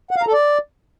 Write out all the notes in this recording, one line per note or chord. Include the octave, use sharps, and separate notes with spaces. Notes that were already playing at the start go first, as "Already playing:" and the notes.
F#5
F5
A#5
A4
D5